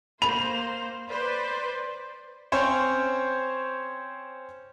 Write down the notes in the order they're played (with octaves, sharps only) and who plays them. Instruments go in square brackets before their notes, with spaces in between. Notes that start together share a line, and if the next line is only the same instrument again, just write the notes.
[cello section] A#3 [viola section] C5 [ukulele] B5 [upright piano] F7
[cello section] B4 D5 [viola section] C5
[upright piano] C4 C#4 C5 C#5